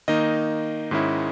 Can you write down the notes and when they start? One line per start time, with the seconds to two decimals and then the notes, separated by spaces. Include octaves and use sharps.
0.08 D#3 A#3 D#4 D#5
0.91 G#2 D#3 G#3 C#4 E4